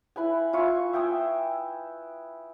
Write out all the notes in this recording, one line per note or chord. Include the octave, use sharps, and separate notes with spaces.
E4 B4 G#5
F4 E5 G#5 C#6
E5 G5 G#5 D#6